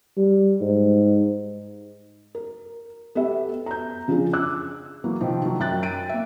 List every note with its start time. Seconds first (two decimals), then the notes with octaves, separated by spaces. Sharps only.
0.17 G3
0.61 G#2
2.35 A#4
3.15 B3 G4 A4 E5
3.66 A#5 G6
4.08 C#3 F3 C#4 D4 F4 G#4
4.33 D6 E6 F#6
5.04 E3 F#3 A#3
5.21 C3 D#3 F3 C4
5.43 D#3 F#3
5.60 F#2 F#3 E5 G5 F#6 A6
5.82 G5 D7 D#7
6.09 A#3 E5